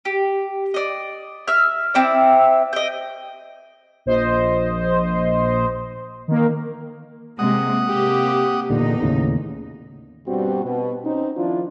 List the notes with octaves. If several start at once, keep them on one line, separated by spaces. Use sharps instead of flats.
G4
D5 D#5
E5 F6
C4 E4 D5
D#5 G5
A#1 C5 D#5
D#3 A#3
C3 G#3 A#3 F#5 D#6
C3 A#3 G4
E2 A#2 D3 D#4
D#2 A2 C#3
G2 B2 G3 C4 F#4
B2
C4 C#4 D#4
D#3 F3 D4 E4 F4